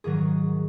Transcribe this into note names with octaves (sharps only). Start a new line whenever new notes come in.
G#2 D#3 F#3 G#4